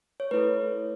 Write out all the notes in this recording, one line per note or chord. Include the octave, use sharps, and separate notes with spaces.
C#5
A3 E4 A4 B4